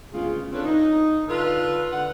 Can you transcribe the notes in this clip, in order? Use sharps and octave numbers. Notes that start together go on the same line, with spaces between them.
D2 C#3 G#3 B3 F4
C4 D4 F4 A4 B4 C#5
D#4
D3 F4 A4 B4
D3 F#5